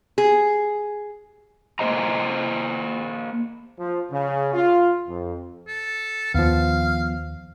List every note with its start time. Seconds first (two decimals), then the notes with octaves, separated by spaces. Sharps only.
0.18 G#4
1.79 A#3 C5 D#5 A#5
3.78 F3
4.11 C#3
4.53 F4
5.08 F2
5.67 A4
6.34 D#2 D#3 F3 B3 F5